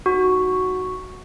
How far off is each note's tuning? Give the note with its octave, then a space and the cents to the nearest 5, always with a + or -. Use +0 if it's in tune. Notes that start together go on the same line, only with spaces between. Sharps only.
D#4 +0 F#4 +0